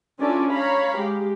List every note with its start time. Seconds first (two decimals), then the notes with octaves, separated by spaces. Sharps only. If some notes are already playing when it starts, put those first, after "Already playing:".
0.20 C#4 D4 E4 F4 A4 D5
0.50 C#5 F5 A#5 B5
0.97 G#3 G4